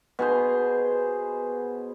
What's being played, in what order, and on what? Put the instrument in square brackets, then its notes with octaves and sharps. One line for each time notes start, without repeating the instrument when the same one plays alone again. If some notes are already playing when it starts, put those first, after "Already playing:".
[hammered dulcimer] B2 G#4 C5